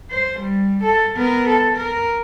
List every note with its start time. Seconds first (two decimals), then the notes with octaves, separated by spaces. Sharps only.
0.11 C5
0.40 G3
0.83 A4
1.16 B3 A#4
1.48 A4
1.77 A#4